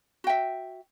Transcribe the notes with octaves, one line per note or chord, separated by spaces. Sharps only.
F#4 E5 G5